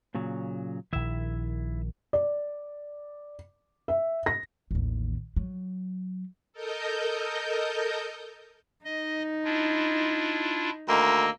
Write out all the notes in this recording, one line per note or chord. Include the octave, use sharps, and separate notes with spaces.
A#2 C#3 F#3
A#1 D#3 E4 E5
D5
E5
A#6
A1 D#2
F#3
A4 A#4 D#5 G6
D#4 D#5
D4 E4 F4
D2 D#3 A#3 D#5 E6